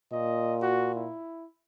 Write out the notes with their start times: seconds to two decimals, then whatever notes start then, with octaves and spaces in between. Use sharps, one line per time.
0.12 A#2 D#5
0.61 F#4
0.95 E4